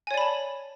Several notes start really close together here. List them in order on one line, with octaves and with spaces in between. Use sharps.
G#5 C#5 D5 B5 A5